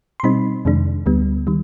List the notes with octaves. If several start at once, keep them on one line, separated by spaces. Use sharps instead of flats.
C6
B2 G3 C4 D#4 B5
F2 C3 D#3 G#3 D4
D2 D3 G3 B3
D#3 G3